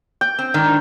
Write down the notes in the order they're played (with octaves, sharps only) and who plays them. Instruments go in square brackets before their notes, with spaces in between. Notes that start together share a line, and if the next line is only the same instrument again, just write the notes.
[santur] G5
[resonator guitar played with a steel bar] C4
G#2 D#3 D4